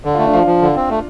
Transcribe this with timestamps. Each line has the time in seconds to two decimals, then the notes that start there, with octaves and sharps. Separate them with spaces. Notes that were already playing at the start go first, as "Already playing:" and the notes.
0.05 D3
0.14 F4
0.18 A3
0.24 D4
0.33 F3 F4
0.47 F3
0.62 D3
0.76 C4
0.90 A3